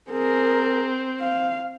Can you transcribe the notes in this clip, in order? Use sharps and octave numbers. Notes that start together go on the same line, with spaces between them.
C4 G#4 A#4
F5